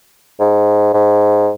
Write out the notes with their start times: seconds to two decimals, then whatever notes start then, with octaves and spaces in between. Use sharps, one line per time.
0.40 G#2
0.94 G#2